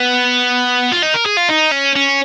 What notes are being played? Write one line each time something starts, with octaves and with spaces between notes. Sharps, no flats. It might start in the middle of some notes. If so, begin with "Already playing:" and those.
Already playing: B3
F4
D#4
A#4
G#4
F4
D#4
C#4
C#4